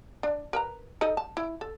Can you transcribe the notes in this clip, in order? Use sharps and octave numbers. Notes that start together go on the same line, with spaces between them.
D4
A#4 B4 A#5
D#4 A4 D#5
A5
E4
A4